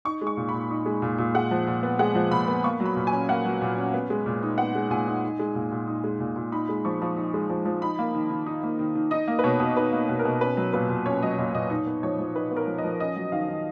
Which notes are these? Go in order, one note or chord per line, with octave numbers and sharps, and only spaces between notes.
D#4 C#6
G#3
C#6
A#2
A#2 B5
D#4
G#3
A#2
A#2
G#3 F#5
F3
A#2
B3
G#3 F#5
F3
A#2 B5
B3
A#3 C#6
F#3
B5
A#2
G#5
C#4
A#3 F#5
F#3
A#2
C#4
B3
G#3
A#2
D#4
B3 F#5
G#3
A#2 G#5
D#4
D#4
G#3
A#2
A#2
D#4
G#3
A#2
A#2
D#4 B5
G#3
F3 C#6
F3
D#4
G#3
F3
F3
D#4 B5
A#3
D#3
D#3
D#4
A#3
D#3
D#3
D#4 D#5
A#3
B4
B2 C#5
B2
D#4 B4
A#3
B2
A#4
B2
C#4 B4
F#3
A#2 B4
A#2
C#4 C#5
F#3 D#5
A#2 D#5
A#2 D#5
D#4 C#5
B3
F3 C#5
F3
D#4 B4
B3
A#4
F3
D#5
F3
C#4 D#5
F#3
D#3 F5
D#3